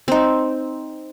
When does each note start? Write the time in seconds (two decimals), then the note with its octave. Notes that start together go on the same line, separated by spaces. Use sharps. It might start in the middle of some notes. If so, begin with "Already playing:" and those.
0.08 C4 D#4